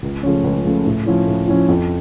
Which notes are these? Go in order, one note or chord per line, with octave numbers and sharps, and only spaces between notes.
C#2
C#3 F3 A3 C#4
C#2
C#3 F3 A3 C#4
A2
F3 C#4 E4
A2
F3 C#4 E4
F2